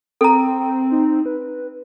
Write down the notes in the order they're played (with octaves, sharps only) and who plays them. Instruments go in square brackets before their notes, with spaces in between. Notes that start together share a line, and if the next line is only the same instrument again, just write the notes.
[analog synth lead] C4 [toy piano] A4 A#5 [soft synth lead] G5
[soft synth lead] D#4
B4